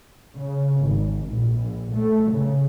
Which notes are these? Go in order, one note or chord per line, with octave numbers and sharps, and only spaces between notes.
C#3
G#1
A#1
A3
C#3